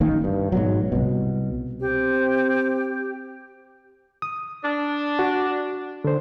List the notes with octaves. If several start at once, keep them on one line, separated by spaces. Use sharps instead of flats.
A1 D#3 A#3
G2
G#2 B2 F#3
C2 B2
C4 G4
D#6
D4
F#4
D3 C5